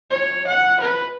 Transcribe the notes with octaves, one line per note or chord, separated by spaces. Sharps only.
C#5
F#5
B4